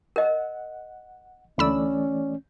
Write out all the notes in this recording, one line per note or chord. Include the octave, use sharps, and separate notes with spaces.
A#4 D#5 F#5
D2 E3 A3 C#4 D5 B5 E6